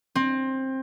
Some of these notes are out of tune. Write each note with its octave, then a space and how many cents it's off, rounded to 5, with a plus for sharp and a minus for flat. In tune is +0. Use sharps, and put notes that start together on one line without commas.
C4 +20